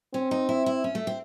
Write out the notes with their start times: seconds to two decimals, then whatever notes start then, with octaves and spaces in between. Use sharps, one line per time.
0.14 C4 C#4
0.31 D#4
0.49 E4
0.66 E4
0.84 C#4
0.95 A3
1.07 C4